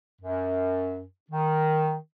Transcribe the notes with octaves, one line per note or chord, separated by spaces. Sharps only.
F#2
D#3